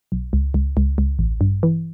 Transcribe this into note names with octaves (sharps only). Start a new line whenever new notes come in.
B1
C#2
C#2
C#2
C#2
A1
G2
E3